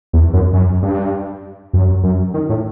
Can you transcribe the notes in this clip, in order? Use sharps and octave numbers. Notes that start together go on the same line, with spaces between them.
E2
F#2
F#2
G2
F#2
F#2
D#3
A2